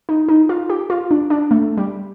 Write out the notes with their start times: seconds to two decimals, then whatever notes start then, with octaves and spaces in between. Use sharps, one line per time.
0.09 D#4
0.29 D#4
0.49 F4
0.70 G4
0.90 F4
1.11 D4
1.30 D4
1.51 A3
1.77 G3